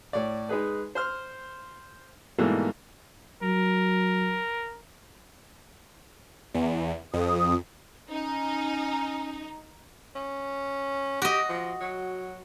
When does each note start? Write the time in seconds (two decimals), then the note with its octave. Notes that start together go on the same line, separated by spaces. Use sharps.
0.13 A2 C#5 D5
0.49 G#3 D#4 G#4 B4
0.95 C5 C6 F6
2.38 G#2 B2 E3 G3 A3 A#3
3.43 F#3 A#4
6.54 E2
7.14 F2 D#6
8.09 C#4 D#4
10.15 C#4
11.22 F#4 G4 D#5
11.49 F3
11.80 F#3